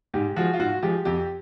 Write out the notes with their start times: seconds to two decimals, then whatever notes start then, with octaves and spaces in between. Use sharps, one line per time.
0.14 G#2 G4
0.36 F3 G#3 F#4
0.54 F4
0.59 G#2 F#4
0.83 F3 G#3 G4
1.05 F2 G4